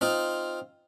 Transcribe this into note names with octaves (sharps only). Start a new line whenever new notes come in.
C4 D#4 F4